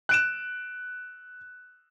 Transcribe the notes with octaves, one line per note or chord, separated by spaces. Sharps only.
F#6 D7 E7